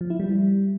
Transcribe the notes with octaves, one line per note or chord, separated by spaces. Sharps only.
F3
E4
G3